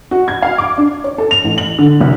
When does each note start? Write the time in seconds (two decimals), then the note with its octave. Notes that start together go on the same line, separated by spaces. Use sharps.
0.11 F#4
0.28 G#6
0.42 F5
0.58 D6
0.78 D4
1.04 C#5
1.18 A4
1.31 F7
1.44 A1
1.58 F#7
1.79 D3
2.01 C2